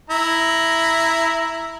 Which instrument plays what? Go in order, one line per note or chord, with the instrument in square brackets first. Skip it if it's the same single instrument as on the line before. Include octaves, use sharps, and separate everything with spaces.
[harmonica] E4 A#5